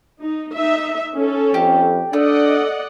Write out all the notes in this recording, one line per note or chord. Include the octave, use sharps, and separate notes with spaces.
D#4
D#4 E5
C#4 A4
F2 G4
A3 D4 D5 D#5 F#5